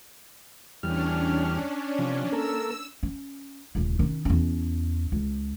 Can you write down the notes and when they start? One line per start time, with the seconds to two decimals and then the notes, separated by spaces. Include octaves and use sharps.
0.83 E2 G3 C#4 D4 F6
1.99 C3 F3
2.32 A#3 A4 A#4 E6
3.03 C#4
3.75 D#1 C#2
3.99 D#3 C#4
4.25 E2 C#4
5.12 C#2